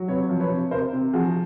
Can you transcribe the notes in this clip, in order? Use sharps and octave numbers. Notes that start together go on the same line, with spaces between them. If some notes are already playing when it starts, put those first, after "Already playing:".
Already playing: F#3
C3 B4 C#5
F3
B4 C#5
C3
C3 A#4 C5
C3
F3 F#4 G#4